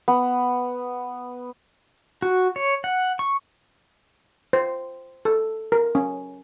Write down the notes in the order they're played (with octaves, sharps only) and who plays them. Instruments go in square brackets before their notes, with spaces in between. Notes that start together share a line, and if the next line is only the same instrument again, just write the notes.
[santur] B3
[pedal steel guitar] F#4
C#5
F#5
C#6
[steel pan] C5
A4
A#4
C#4